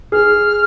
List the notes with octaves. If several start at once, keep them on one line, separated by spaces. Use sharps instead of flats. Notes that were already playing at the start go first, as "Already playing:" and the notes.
G#4 F6